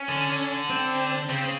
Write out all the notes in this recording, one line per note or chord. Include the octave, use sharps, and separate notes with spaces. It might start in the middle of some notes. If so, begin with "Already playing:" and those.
Already playing: C#4
D3
C4
C#3 C4